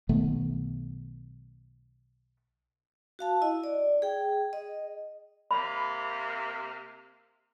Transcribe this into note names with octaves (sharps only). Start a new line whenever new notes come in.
B1 D#3 A3 B3
F#4 F5 A5
E4 D#5
D5
G#4 G5
D#5
C3 A#3 B5